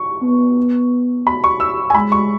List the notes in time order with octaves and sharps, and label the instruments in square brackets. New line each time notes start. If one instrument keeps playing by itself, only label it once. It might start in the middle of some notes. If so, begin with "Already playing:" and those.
Already playing: [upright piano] C#6
[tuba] B3
[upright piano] B5
C#6
E6
G#5
[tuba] G#3 [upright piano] B5
[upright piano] C#6